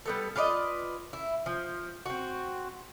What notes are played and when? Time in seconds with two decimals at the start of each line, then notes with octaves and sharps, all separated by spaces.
0.05 G3 B3 A4
0.36 F4 B4 D5 D#5
1.13 E4
1.46 F3
2.06 C4 F#4